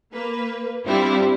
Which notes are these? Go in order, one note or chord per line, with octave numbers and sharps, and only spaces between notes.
A#3 B4
G2 G3 C4 D4 E4 F4